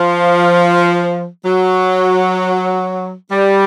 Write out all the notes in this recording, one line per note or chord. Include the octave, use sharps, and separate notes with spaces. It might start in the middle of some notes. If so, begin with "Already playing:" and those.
Already playing: F3
F#3
G3